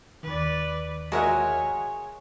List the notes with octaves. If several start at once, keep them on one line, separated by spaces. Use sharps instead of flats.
D#2 D#3 B4 D5
G#3 F#4 G#4 A#4 C#5 E5 F#5